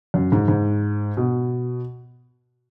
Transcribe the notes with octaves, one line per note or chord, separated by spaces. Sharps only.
F#2
G#2
G#2
B2